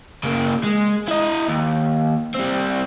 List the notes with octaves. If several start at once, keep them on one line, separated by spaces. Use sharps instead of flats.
C#3 A#3
G#3
E4 D#5
D#2
G3 C4